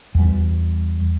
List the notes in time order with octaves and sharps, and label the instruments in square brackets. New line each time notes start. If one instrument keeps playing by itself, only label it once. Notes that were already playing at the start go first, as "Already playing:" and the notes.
[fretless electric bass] E2 G3